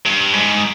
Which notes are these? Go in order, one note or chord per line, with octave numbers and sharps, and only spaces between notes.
G2
G#2